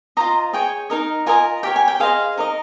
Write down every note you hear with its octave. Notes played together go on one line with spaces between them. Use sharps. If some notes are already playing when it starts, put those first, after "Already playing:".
F4 C5 D#5 A#5
G#4 C#5 G5
D#4 A#4 D#5
F4 A#4 D#5 G#5
G4 A#4 C#5 G5
G#5
G5
G#4 C5 D#5 F5
D#4 A#4 D#5